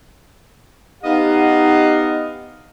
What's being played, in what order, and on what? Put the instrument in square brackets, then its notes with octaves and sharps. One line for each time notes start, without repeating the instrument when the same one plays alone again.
[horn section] B3 D#4 G4 D#5 F5 F#5